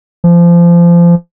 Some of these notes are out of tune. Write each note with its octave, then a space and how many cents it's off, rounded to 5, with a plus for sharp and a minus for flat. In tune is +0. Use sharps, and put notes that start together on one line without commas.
F3 -25